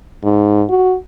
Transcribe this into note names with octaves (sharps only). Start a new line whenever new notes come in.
G#2
F#4